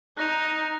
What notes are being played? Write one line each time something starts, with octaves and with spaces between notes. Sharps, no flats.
D#4 F#6 A#6 F7